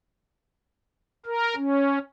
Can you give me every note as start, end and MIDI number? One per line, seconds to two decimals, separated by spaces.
1.26 1.55 70
1.56 1.99 61